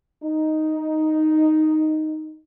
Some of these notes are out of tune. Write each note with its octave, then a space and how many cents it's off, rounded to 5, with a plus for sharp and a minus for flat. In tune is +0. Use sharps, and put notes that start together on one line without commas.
D#4 +0